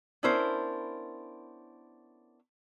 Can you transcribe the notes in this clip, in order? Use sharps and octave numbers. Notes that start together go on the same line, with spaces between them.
B3 C#4 D4 E4 A#4 C5